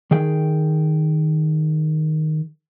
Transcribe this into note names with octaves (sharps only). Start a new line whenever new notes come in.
D#3 G#4 G5